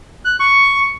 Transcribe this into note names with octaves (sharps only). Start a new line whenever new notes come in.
F#6
C#6